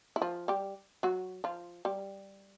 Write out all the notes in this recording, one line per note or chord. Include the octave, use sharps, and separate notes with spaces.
E4
F3 F4
G3 G4
F#3 F#4
F3 F4
G3 G4